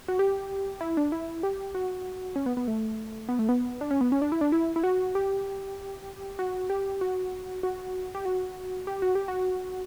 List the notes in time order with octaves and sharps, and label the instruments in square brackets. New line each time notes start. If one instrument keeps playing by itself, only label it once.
[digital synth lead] F#4
G4
E4
D4
E4
G4
F#4
C#4
B3
B3
A3
B3
A3
B3
D4
C#4
B3
C#4
D4
E4
D4
E4
E4
F#4
G4
F#4
G4
F#4
F#4
G4
F#4
G4
F#4
G4
F#4